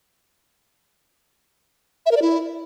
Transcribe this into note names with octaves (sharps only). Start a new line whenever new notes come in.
E5
A#4
D5
E4